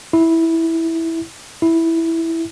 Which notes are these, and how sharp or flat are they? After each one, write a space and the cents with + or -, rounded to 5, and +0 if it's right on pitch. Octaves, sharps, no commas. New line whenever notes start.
E4 -10
E4 -5